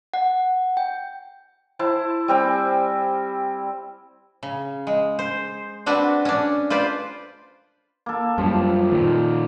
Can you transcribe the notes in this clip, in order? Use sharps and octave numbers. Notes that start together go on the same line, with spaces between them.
F#5
G5
E4 C5 A5
G3 C4 G5 G#5
C#3
G#3
C5
C4 D4 F#4 B4
C#4 D4
F4 B4 C5 D5
A#3 A4
F#2 F3 G3
A#2 D#3